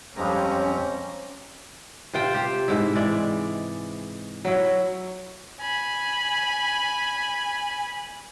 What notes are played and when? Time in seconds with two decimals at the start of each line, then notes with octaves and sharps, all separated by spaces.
0.16 F2 G3 G#3 C4 C#4 G4 A#5
2.13 C3 F4 C5 G5
2.34 G4 C5
2.68 G#2 E4
2.95 E3 G#3 D5
4.45 F#3 E4
5.60 G#5 B5